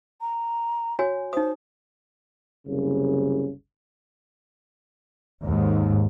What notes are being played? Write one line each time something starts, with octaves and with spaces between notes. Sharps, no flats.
A#5
F#4 C#5 G#5
D#4 C5 D#6
F#1 C2 C#3
D#2 G#2